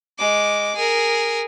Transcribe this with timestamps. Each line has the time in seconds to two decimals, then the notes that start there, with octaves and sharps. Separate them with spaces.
0.18 G#3 D6
0.76 G#4 A#4